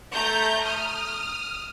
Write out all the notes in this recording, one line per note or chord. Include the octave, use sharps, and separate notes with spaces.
A3 A#5 G6
D#6 F6